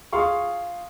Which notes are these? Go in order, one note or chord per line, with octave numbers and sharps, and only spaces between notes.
F4 G#4 F5 C6 C#6